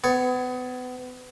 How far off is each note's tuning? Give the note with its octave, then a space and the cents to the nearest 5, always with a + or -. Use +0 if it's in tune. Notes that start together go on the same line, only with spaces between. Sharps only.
B3 +30 C#5 +0